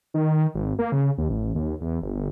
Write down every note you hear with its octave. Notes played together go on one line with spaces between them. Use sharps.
D#3
G#1
A#3
C#3
D#2
A1
D#2
E2
G1
G1